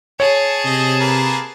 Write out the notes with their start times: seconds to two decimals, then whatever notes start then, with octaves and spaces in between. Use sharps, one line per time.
0.20 G#4 C#5 A5
0.65 C3 C4 D#5
1.00 A#3 A#4 B4